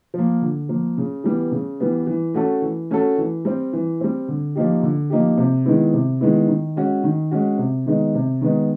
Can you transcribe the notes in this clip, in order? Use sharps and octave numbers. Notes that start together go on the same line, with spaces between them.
F3 A#3
D3
F3 A#3
C#3
E3 G3 B3
C#3
E3 G3 B3
E3
A3 C#4 F#4 A4
E3
A3 C#4 F#4 A4
E3
G3 C4
E3
G3 C4
D3
F3 A#3 D#4 G4
D3
F3 A#3 D#4 G4
C3
D#3 G#3 B3 E4
C3
D#3 G#3 B3 E4
D#3
G#3 C#4 F#4
D#3
G#3 C#4 F#4
C3
D#3 G#3 B3 D#4
C3
D#3 G#3 B3 D#4